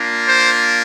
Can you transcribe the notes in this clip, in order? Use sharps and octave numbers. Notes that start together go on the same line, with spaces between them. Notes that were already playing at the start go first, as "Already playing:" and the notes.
Already playing: A#3 D4 F4
C5